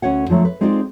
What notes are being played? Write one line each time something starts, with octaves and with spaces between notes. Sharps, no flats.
D2 C#4 B4 C#5 F#5
D3 F3 F#3 A3
B4
G#3 C4 D#4 F4 C5 D5